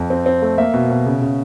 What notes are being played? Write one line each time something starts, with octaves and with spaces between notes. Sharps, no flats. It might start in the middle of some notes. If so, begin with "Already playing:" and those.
Already playing: F2
C4
C4
A3
A#3 E5
B2
B2
C#3
C#3